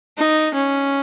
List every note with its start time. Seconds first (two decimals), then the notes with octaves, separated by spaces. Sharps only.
0.18 D#4
0.55 C#4